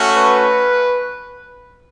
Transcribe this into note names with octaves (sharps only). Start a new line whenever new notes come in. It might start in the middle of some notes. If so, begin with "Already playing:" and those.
Already playing: A3 C#4 F#4
B4